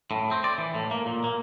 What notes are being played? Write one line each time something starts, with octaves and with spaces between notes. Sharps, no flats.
A2
C4
D5
E3
A2
A#3
A#2
A#3